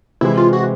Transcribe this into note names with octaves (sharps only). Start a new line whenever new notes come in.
C3 E3 G#3 E4
F4
F#4